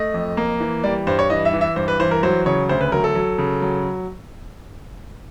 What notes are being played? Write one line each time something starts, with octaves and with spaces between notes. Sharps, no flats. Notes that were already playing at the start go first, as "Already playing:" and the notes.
Already playing: A3 D#5
F2
A#3
E3
G3 D5
G2 C5
C#5
E3 D#5
E5
E3
E5
G2 C5
B4
E3 C5
A#4
F#3 C5
C#3 C#5
D2 C5
B4
F#3 A#4
A4
F#3
C#3
F#3